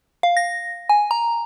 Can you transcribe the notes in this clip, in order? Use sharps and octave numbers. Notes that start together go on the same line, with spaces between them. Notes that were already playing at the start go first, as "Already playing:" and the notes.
F5
A#6
G#5
A#5